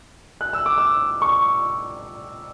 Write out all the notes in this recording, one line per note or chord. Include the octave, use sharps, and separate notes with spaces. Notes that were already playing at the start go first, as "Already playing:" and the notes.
F#6
E6
D6
E6
C#6